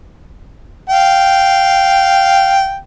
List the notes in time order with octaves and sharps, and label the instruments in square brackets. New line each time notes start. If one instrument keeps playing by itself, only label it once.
[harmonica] F5 G5